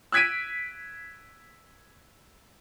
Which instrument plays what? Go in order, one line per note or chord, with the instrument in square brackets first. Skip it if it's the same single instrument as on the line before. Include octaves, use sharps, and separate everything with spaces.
[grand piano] E6 F#6 G#6 B6 D7 D#7